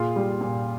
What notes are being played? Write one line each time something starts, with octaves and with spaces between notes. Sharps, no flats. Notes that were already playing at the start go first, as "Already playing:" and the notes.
Already playing: A#2 F4 G#4
G3
A#2